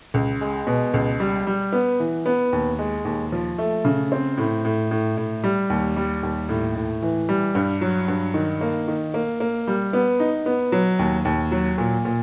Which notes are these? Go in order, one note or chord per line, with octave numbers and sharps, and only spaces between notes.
C#2
G#3
B2
C#2
G3
G3
B3
E3
B3
D#2
G#3
D#2
F3
A3
C#3
C4
A2
A2
A2
A2
G3
D#2
G3
D#2
A2
A2
E3
G3
G2
F#3
G2
D#3
A#3
D#3
A#3
A#3
G3
B3
D#4
B3
F#3
D#2
D#2
F#3
A#2
A#2